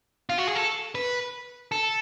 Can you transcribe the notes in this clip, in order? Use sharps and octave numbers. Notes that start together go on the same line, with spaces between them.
F4
F#4
G#4
A4
B4
A4